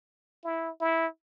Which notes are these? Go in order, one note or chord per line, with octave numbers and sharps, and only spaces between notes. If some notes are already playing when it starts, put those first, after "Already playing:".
E4
E4